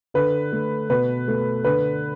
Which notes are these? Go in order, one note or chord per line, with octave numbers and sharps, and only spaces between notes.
D3 B4
A3
B2 B4
A3
D3 B4